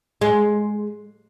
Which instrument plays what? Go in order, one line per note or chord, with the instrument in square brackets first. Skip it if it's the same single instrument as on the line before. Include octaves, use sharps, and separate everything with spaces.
[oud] G#3